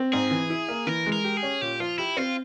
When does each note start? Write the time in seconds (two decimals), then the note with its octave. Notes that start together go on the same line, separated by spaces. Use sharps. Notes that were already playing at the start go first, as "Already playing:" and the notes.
Already playing: C4
0.13 G#2 G#4
0.31 E3
0.50 E4
0.69 A#3
0.87 E3 A#4
1.06 G#3
1.12 A#4
1.24 G4
1.37 G#4
1.43 C#4
1.61 A#2 G4
1.80 F3 F4
1.98 E4 G4
2.17 C4 F4